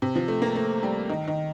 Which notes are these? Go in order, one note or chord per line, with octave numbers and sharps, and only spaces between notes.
C3
F3
A3
A#3
A3
G3
D#3
D#3